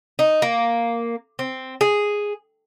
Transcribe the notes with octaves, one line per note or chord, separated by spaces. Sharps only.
D#4
A#3
C4
G#4